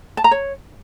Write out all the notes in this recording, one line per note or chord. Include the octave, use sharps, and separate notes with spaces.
A5
A#5
C#5